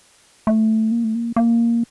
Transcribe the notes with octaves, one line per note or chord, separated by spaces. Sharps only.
A3
A#3
A3
A#3
A#3